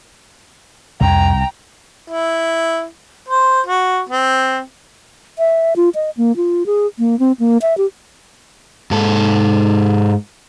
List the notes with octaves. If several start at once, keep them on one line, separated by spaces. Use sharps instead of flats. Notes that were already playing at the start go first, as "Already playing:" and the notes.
C2 F2 G5 A#5
E4
C5
F#4
C4
E5
F4
D#5
A#3
F4
G#4
A#3
C4
A#3
E5
G4
G#2 A4